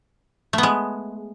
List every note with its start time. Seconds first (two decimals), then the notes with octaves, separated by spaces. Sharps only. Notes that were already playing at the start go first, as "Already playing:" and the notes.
0.53 A3
0.58 B3
0.63 G#3